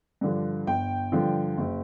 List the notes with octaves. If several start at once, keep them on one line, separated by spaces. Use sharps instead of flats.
G2 D3 F3
G1 G5
G2 D3 F3
F#1